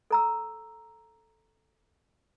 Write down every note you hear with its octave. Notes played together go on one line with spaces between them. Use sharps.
A4 A#5 E6